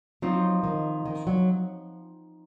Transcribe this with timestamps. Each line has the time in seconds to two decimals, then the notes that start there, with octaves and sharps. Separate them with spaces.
0.22 F3 F#3 C4 D#4
0.63 D#3
1.05 D#3
1.27 F#3